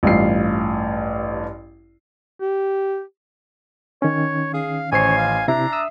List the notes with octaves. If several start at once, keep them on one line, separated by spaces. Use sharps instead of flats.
A1 G2 F4 C7
G4
D#3 C#4 C#5
G#4 F5
A1 C5 C#5 G#5 C7
F5
C3 D4 E4 E5 A#5
D#6 E6